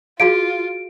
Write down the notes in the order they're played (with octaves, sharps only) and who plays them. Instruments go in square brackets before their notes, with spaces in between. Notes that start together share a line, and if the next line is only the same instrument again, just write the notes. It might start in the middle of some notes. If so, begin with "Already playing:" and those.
[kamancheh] F4 [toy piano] F#4 G#4 F5 [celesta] D7